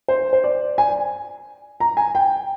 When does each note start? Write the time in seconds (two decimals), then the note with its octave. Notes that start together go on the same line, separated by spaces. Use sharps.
0.08 C5
0.33 C5
0.44 D5
0.78 G#5
1.80 A#5
1.97 G#5
2.15 G5